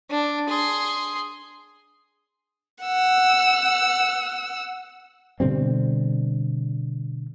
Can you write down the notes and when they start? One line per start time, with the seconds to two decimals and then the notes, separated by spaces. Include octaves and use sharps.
0.10 D4
0.50 G#4 C6
2.84 F#5 E6
5.40 B2 D3 G3 C4